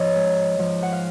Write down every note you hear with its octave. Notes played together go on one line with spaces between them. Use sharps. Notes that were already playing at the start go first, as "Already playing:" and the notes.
Already playing: F3 C#5 D#5
G#2
F3
F#5
F5